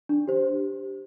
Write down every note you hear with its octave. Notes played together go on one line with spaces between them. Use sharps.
D4
G4 C5